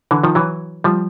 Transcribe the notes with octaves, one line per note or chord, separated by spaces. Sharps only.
D3 E3
D#3 F3
E3 F#3
F3 G3